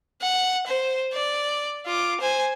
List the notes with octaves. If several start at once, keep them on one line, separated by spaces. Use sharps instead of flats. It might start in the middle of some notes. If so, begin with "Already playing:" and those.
F#5
C5
D5
F4 D6
C5 G#5